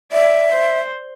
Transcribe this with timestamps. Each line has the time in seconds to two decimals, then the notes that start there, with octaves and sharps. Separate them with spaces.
0.12 D5 E5
0.52 C5